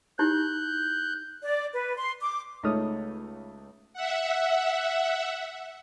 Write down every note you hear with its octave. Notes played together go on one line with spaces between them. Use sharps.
D#4 E4 G4 F#6 G6
D5
B4
C6
D6
C#2 A3 D#4 C#5 D#6 F6
E5 F#5